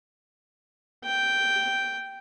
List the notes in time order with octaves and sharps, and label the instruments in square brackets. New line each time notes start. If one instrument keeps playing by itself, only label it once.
[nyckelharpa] G5